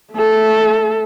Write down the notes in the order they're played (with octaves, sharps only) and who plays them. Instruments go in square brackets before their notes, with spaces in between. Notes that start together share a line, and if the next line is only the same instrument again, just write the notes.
[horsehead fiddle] A3 A4